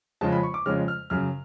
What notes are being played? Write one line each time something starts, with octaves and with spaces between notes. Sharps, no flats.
F2 C#3 G#3 C#4 F4 A5
B5
C#6
D6
F2 C#3 G#3 C#4 F4 F6
F6
F#2 C#3 F#3 F6